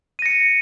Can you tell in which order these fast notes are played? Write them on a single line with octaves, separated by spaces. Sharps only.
D#7 A#6 C#7